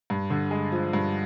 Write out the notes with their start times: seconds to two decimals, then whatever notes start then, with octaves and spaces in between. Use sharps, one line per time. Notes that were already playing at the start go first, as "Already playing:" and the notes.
0.10 G2
0.30 D3
0.51 G#3
0.72 F3
0.93 G2